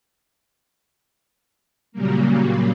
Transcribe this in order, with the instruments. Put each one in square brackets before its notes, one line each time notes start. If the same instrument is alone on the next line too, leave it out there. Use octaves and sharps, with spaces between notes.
[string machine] A#2 C#3 F#3 G3 A#3